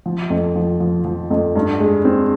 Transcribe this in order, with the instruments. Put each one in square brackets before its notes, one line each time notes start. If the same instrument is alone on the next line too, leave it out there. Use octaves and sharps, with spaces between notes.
[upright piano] F3
F2
F3
F3
F3
F2
G2
G#3
C4